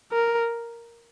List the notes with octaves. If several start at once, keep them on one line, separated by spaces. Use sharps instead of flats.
A#4